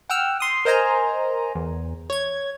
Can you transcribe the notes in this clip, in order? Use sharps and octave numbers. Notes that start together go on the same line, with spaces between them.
F#5 G5 E6 F6
C6 D#6
A#4 C5 D#5 G#5 A#5
E2
C#5 G#6